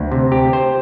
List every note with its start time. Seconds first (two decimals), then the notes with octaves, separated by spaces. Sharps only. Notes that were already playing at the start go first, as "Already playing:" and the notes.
Already playing: D2
0.12 C3
0.32 G4
0.53 C5